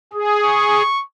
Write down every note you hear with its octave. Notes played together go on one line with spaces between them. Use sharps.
G#4
C#6